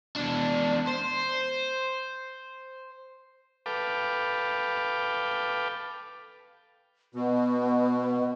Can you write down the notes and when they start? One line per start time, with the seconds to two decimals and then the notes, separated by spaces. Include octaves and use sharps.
0.16 E2 D4
0.87 C5
3.66 A4 B4 F5 G5 D6
7.15 B2 B3